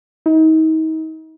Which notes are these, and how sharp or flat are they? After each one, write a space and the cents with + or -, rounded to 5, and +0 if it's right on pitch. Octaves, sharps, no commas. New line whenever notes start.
D#4 +35